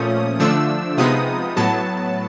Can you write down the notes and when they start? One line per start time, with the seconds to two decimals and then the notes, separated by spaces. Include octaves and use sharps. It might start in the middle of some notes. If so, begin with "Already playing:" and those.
Already playing: A#2 F3 A3 C#4 D#6
0.40 D3 F3 A3 D4 E6
0.98 C3 F3 G#3 B3 D#4 D#6
1.57 A2 F#3 B3 A5